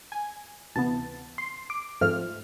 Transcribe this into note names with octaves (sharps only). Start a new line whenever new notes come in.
G#5
D2 C3 E3 B3 A5
C6
D6
G#2 F3 A3 C4 F6